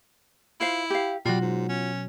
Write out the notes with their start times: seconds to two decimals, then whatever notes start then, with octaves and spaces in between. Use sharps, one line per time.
0.60 E4 F4 C5 F5
0.90 G4 F5
1.25 B2 F#3 G3 F4 F#4
1.41 G#2
1.69 C#4